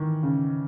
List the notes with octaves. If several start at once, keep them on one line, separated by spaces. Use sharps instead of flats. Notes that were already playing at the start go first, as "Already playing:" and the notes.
Already playing: D#3 E3
C#3